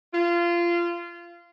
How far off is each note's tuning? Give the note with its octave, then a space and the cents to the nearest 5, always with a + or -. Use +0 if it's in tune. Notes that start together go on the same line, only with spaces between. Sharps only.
F4 -20